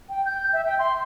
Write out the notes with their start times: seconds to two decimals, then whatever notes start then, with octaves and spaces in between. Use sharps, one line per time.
0.09 G5
0.25 G6
0.53 E5
0.66 G5
0.79 C6